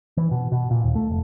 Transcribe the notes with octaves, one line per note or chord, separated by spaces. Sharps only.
E3
B2
B2
A#2
D#2
A3
F1